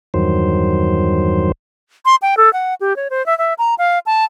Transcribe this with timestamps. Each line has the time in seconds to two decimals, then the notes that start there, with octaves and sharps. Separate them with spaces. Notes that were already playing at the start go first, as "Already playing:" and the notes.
0.14 E2 G2 D#3 F#3 C5
2.05 C6
2.22 G5
2.37 A4
2.53 F#5
2.81 G4
2.96 C#5
3.10 C5
3.26 E5
3.38 E5
3.58 A#5
3.78 F5
4.06 A5